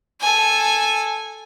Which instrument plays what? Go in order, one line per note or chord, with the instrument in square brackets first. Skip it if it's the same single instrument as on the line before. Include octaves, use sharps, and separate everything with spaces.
[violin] A4 G#5